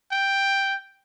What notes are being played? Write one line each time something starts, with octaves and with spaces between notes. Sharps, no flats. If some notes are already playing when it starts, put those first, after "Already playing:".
G5